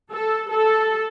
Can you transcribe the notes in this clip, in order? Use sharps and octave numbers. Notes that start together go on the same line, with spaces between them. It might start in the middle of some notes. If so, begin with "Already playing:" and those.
A4
A4